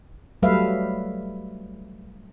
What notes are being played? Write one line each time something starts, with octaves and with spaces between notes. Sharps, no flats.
F#3 G3 A3 B4 E5 F5